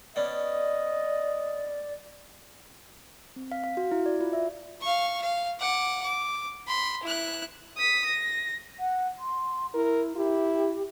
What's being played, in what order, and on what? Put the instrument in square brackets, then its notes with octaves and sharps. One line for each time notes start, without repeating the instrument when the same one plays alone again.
[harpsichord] B3 C#4 D4 [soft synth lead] D5 [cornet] D#5
[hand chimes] C4
F5
F5
F#4
E4
D5
F4
E5
[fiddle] F5 C#6
F5
F#5 D6
D6
B5 C6
E4 F#6
[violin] D#6 B6
A#6
[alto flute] F#5
C6
[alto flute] E4 [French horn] A#4
[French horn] E4 [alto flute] G4